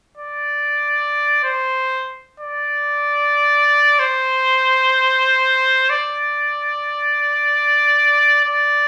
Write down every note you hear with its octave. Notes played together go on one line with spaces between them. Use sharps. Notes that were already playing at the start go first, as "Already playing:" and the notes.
D5
C5
D5
C5
D5
D5